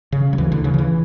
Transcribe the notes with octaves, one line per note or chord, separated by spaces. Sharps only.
C#3
F#3
D2 E3
D3
C#3 E3
D3
E3